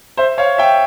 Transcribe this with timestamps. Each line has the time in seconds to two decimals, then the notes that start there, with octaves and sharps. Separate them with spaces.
0.17 C5 E5
0.38 C#5 F5
0.58 E5 G5